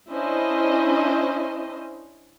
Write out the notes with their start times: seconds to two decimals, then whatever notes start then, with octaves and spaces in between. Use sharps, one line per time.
0.11 C#4 D4 E4 C5 D#5